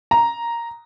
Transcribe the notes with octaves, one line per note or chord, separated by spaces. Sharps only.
A#5